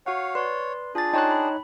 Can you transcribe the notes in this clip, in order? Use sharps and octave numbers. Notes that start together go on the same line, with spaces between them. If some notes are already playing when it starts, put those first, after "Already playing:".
F#4 C#5 F5 F#5
B4 C#5 D5 C6
D4 F4 G#4 A6
D#4 C#5 G5 A5 C6 F#6
B5